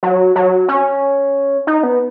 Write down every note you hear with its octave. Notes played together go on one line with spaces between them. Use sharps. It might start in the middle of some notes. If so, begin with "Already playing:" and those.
F#3
F#3
C#4
D#4
B3